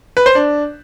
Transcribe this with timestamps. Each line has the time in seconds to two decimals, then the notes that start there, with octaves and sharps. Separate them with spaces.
0.17 B4
0.26 C5
0.35 D4